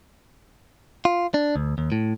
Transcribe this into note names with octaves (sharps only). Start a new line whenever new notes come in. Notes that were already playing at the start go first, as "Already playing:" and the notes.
F4
D4
D2
D#2
A2